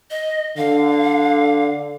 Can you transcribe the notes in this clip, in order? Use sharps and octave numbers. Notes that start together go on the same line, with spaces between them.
D#5
D3 F5